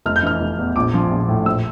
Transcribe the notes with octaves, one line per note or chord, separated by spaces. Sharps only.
F1 F6
G6
E3 F6
F1
E2
A#1 D6
F3
A#1
A2
A#1 E6